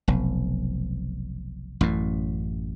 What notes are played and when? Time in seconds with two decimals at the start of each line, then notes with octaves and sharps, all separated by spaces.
0.08 F1 B1
1.81 A1 F#2 A2